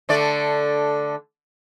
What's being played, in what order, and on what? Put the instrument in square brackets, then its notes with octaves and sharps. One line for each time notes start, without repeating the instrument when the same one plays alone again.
[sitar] D3 A3 D5